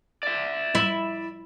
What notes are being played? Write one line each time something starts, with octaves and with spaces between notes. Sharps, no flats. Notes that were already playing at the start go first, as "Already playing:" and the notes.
D5 E5
E4